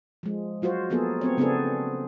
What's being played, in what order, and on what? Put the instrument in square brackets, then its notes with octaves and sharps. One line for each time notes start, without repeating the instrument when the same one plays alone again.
[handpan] F3 G#3
F#3 F4 F#4 C5
F3 A#3 B3 G#4 A4
B3 C4 C#5
C#3 B3 C4 D4 G#4 A4